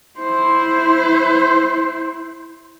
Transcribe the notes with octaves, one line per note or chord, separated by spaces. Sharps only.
E4 C5